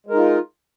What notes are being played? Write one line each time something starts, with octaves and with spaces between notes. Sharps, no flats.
G#3 D#4 F4 A#4